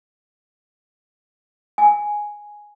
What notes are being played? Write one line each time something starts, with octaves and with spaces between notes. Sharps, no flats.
G#5